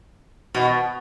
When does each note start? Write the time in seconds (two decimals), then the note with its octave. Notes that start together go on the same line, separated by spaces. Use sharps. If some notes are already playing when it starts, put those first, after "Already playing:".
0.55 B2